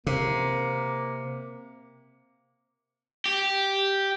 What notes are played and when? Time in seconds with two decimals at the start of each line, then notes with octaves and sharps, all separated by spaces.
0.07 C3 A#3
3.26 G4